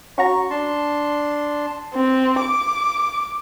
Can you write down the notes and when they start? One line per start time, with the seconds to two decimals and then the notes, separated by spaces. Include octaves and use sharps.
0.18 C#4 F#4 A#5 C#6
0.50 D4 A5 C6
1.94 C4
2.41 D6